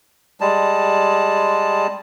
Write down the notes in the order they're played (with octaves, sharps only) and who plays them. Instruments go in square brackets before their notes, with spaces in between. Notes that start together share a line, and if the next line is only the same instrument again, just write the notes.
[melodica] G3 G#3 A5